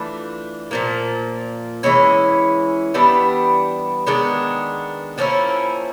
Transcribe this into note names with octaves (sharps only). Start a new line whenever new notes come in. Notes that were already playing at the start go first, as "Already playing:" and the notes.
Already playing: E3 A3 D4 F4
A#2 F3 A#3
E3 G#3 C#4 E4
E3 G3 B3 D4
D#3 G#3 B3 D4
F3 A#3 C#4 E4